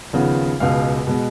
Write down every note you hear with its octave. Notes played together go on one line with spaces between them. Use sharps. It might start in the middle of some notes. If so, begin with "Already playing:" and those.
D#2 C#3 F3 B3
C#2 B2 G#3 F5
B2 G#3 B3